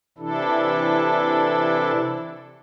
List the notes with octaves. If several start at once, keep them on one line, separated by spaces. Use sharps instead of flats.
C3 E3 D4 E4 A4